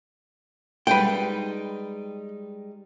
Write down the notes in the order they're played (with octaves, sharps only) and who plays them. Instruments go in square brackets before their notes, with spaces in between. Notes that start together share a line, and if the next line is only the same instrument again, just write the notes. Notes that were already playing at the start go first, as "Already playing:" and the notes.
[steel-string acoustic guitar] G3 G#3 D#4 [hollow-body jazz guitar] B4 G5